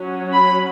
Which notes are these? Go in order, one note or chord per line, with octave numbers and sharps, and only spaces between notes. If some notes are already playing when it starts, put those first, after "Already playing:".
Already playing: F#3 C#4
B5